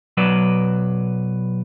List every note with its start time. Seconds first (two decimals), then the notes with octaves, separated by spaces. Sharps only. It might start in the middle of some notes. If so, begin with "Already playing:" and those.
0.17 B1 F#3 B4 D5